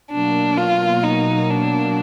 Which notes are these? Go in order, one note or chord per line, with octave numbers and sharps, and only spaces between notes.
B2 F#3 A#3 D4
F4
D#4
D4